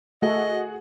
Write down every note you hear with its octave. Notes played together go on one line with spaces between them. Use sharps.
A3 F#4 G#4 D#5